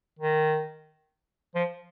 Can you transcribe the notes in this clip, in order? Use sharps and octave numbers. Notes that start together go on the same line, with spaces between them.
D#3
F3